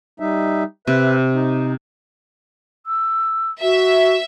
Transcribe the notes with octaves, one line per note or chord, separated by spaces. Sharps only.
G3 D#4 E5
C3 B4 E5
D#4
E6
F#4 E5